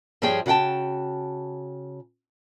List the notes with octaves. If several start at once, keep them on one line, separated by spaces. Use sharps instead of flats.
G2 F3 G3 G#4 C#5 G5
C#3 F#4 F#5 G5 A5